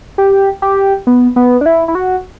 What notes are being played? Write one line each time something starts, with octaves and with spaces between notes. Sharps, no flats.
G4
G4
B3
B3
D4
E4
E4
F#4